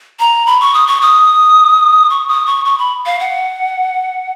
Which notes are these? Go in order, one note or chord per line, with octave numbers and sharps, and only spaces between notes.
A#5
B5
C#6
D#6
C#6
D#6
C#6
D#6
C#6
C#6
B5
F5
F#5